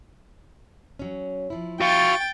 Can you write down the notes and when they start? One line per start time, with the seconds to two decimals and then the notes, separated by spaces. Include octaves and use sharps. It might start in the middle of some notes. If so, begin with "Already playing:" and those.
0.99 F#3 C#4
1.50 F3 E4
1.81 F#4 F5 G5 C#6 A6